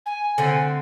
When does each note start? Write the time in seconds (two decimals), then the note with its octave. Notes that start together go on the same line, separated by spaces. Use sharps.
0.05 G#5
0.38 D3 A3 C4